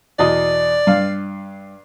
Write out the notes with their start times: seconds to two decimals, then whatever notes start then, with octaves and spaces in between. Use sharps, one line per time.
0.19 E2 B2 D5 D#5
0.87 G2 F5